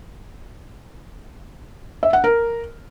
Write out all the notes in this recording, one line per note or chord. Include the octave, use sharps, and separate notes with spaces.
E5
F#5
A#4